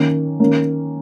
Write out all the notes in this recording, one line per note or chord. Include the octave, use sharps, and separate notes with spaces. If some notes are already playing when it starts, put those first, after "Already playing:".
Already playing: D#3 A#3 C#4
D#3 A#3 C#4